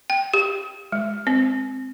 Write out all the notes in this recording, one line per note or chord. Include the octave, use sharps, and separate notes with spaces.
G5
G4
G#3
C4